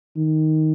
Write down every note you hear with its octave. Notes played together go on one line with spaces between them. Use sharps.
D#3